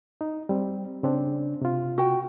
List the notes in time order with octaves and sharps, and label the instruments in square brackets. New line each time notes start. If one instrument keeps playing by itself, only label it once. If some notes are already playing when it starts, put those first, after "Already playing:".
[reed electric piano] D#4
G3 C4
C#3 C4 D4
C3 F4
[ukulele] F#4 G5